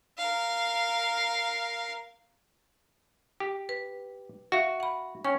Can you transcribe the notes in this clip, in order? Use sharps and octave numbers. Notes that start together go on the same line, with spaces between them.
A#4 F5
G4
B4
F#4 E5 F5
F#5 B5
C#4 G5 C#6